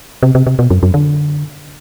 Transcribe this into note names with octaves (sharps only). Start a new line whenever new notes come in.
C3
C3
C3
B2
F#2
F#2
D3